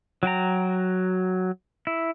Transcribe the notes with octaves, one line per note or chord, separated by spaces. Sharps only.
F#3 F#4 G5 A#5
E4